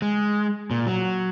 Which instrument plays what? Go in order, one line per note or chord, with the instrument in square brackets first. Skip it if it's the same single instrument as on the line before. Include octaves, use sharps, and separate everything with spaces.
[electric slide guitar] G#3
A#2
F#3